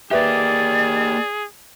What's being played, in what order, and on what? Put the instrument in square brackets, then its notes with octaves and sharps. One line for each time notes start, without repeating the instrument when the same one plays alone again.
[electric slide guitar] A#3 G4 [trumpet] G#4 [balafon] B4 E5 [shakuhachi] D5